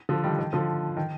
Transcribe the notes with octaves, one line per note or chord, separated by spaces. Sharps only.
D3 F3
D#3 G3
D#3
D3 F3
D#3